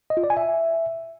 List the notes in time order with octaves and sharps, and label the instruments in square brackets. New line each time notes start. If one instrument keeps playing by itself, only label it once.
[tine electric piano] D#5
F4
D5
G#5
E5